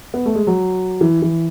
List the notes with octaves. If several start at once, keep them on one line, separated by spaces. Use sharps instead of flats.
B3
A3
G#3
F#3
E3
E3